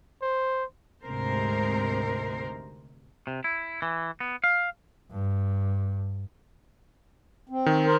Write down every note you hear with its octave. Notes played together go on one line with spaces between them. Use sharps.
C5
D2 G#2 C3 G#3 A#4 C5
C3
E4
E3
B3
F5
G2
C4
D#3
A#4 C5